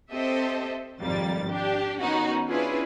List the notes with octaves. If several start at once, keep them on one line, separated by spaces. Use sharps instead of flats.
C4 G4 A4 C5 D#5 E5
G#1 F2 G3 A#3 A6
D4 G4
D#3 B3 C#4 D#4 F#4
C#4 D4 E4 F4 G#4 B4